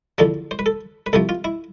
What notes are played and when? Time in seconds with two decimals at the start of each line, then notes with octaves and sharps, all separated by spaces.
0.18 E2 D3 F3 A4
0.51 C5
0.59 B4
0.66 A4
1.06 B4
1.13 C2 C3 F3 A4
1.29 F4
1.44 E4